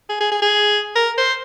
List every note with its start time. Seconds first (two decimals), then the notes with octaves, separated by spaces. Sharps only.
0.09 G#4
0.21 G#4
0.32 G#4
0.42 G#4
0.96 A#4
1.18 C5